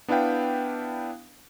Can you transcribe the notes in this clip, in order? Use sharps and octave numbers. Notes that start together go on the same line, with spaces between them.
B3 D4 E4 B4 F5 G5